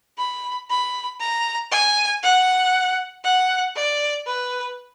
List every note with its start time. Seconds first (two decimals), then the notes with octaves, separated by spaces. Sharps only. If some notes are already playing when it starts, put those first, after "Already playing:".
0.18 B5
0.70 B5
1.20 A#5
1.72 G#5
2.23 F#5
3.24 F#5
3.76 D5
4.27 B4